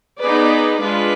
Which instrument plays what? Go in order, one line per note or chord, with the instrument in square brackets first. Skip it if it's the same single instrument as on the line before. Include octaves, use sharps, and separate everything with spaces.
[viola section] B3 D#4 G#4 B4 D5
G#3 D4 F4 B4